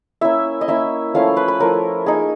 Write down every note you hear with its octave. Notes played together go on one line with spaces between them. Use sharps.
A#3 C#4 E4 E5
D#5
A#3 C#4 E4 E5
F3 A3 C#4 E4 F5
B4
B4
F3 A3 C#4 E4 A#4
A#3 D#4 G#4